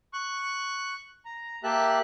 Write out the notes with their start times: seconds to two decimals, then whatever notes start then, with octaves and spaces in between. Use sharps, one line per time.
0.13 C#6 F#6
1.25 A#5
1.64 A#3 G4 E5 A5 F#6